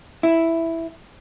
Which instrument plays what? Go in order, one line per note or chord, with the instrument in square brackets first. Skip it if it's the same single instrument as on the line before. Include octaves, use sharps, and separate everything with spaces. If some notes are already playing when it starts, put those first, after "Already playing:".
[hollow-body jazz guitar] E4